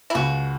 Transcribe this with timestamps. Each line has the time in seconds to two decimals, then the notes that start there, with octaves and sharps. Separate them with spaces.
0.10 E4
0.15 C#2 F#4